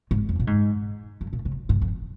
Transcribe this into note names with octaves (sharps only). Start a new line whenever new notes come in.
G#2
F2
A#2
G#2
F2
A#2
C#3
G#2
F2